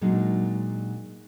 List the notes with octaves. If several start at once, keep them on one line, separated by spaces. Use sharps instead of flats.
A#2 F#3 G#3 D4 D#4